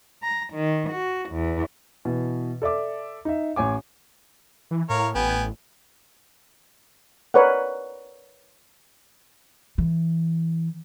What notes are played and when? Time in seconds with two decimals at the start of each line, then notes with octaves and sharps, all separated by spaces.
0.22 A#5
0.53 D#3
0.90 F#4
1.29 E2
2.05 B2 E3
2.62 A4 D5 E5 D6
3.25 D#4 E5
3.56 A1 C#5 G#5 D6
4.71 E3
4.90 A2 A#4 C#5 F5
5.15 A1 B3 G5 G#5
7.34 A#4 B4 C#5 D5 F#5
9.78 E3